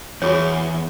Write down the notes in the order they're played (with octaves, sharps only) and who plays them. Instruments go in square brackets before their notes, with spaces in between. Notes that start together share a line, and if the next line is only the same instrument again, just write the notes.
[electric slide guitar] E2 [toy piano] F#4 G#4 C#5